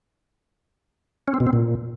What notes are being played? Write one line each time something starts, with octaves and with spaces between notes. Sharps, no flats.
C#4
C4
B2
C4
A#2